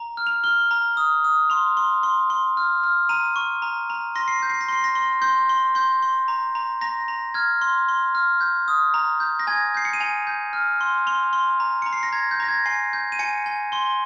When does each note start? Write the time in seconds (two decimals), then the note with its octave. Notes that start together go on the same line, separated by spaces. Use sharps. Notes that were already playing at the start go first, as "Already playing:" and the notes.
Already playing: A#5
0.17 F6
0.27 F7
0.44 F6 G7
0.71 A#5
0.97 D#6
1.24 D#6
1.50 C6 F7
1.77 C6
2.03 C6
2.30 C6
2.57 F6
2.83 F6
3.09 A#5 D#7
3.36 C#6
3.62 A#5
3.90 A#5
4.15 C6 A#6
4.28 C7
4.39 G6 A#6
4.50 C7
4.61 A#6
4.69 C6 C7
4.84 A#6
4.95 C6
5.22 C6 G6
5.49 C6
5.75 C6 G6
6.03 C6
6.28 A#5
6.55 A#5
6.81 A#5 A#6
7.08 A#5
7.34 F6 G#6
7.62 C6
7.89 C6
8.15 F6
8.41 G6
8.68 D#6
8.94 A#5
9.20 G6
9.39 A#6
9.47 G#5 G#6
9.74 G6 C7
9.85 C#7
9.93 D#7
10.00 G#5 F7
10.27 G6
10.53 F6
10.81 C6
11.07 C6 F7
11.33 C6
11.60 A#5
11.82 A#5 C#7
11.93 C7
12.03 A#6
12.12 A#5 G#6
12.31 G6
12.40 A#5 A#6
12.48 G#6
12.66 G#5 C7
12.93 G6
13.12 D#7
13.19 G#5 C#7
13.46 G#5
13.72 C6 G7